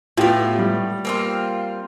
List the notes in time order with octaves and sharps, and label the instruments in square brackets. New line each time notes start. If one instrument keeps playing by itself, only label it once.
[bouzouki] A2 B3 [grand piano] F4 G4
[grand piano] G3
[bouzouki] A#3 C4 F4